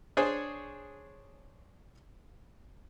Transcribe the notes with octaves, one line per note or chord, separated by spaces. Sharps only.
D4 G#4 C5 C#5 G#5